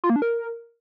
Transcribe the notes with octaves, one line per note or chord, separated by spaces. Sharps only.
F4
A#3
D4
A#4